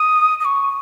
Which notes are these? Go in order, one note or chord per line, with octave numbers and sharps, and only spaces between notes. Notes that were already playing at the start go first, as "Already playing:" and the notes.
Already playing: D#6
D#6
C#6